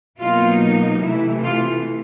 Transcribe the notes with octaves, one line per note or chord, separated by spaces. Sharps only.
B2 F#3 A#3 D#4 F4
C3 E3 A3 E4
F4